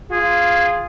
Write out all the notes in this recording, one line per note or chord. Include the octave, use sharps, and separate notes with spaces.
F4 G#4